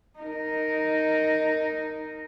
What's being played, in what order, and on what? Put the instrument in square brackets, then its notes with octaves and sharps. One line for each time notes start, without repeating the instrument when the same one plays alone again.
[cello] D#4 A#4